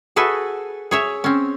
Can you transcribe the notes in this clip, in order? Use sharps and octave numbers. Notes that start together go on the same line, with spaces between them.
F#4 G#4 A4 B4 E5
G#4 C#5 E5
C4 C#4